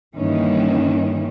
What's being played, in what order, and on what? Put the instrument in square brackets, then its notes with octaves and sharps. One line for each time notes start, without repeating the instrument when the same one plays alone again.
[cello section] G2 D#3 E3 A#3 C#4 D#4